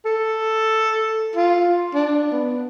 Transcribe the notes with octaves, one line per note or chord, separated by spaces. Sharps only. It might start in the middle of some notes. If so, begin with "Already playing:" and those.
A4
F4
D4
B3